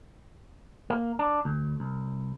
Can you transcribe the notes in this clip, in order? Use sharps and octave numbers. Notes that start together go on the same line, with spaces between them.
A#3
D4
D2
C2